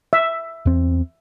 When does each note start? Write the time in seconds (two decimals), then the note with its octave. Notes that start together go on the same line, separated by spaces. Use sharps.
0.13 E5
0.66 E2 C4